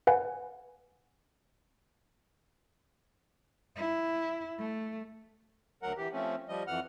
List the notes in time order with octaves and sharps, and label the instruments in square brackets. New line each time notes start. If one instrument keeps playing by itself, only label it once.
[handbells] B4 F5 F#5 G#5
[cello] E4
A3
[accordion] D2 F#3 A#4 F#5
E3 G4
F3 A3 C4 C#4
F3 G3 D#5
F2 E3 F#5 F6